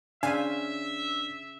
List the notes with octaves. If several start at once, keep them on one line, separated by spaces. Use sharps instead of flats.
C#3 D4 C5 E5 F5 G#5 B5